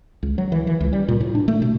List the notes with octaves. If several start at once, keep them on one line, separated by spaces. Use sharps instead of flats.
C#2
F#3
E3
E3
C#2
G3
A#2
A2
D4
A3
B2